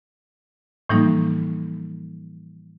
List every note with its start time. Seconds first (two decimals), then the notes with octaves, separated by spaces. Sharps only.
0.89 A2 E3 F3 G3 A#3 D#4